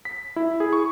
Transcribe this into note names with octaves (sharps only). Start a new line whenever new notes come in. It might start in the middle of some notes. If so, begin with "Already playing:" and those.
B6
E4
G#4
C#6